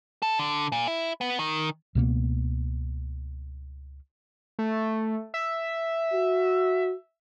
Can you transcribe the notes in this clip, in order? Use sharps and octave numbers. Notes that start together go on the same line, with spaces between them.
A4
D3
A#2
E4
B3
D#3
C#2 B2 A#3 B3
A3
E5
F#4